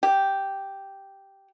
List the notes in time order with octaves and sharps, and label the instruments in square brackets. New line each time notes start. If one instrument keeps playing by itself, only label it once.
[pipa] G4